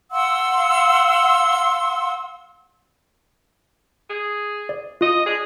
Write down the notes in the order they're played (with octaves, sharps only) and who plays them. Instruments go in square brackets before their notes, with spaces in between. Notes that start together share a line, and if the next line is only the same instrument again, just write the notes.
[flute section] F5 F#5 C6 E6
[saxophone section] G#4
[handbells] D5
[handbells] F4 [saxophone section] D#5
[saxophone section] D4 G#4